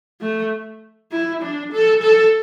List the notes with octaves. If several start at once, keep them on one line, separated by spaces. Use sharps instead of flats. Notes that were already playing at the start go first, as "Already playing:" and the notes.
A3
E4
D4
A4
A4